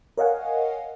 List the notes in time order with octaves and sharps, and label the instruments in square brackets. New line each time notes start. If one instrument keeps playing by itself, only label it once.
[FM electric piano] A#4 C#5 D#5 F5 F#5 G#5